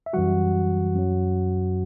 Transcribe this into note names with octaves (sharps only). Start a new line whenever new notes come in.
E5
F#2 E3 G3 F#4 F#5
F#2 F#3